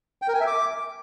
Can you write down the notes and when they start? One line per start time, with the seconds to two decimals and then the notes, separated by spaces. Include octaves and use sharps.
0.22 G5
0.28 A#4
0.34 G#5
0.41 E5
0.47 D6